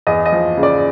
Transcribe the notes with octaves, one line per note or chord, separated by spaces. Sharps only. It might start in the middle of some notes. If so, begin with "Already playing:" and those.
E2 D#5
D#5
F3
C#3
D5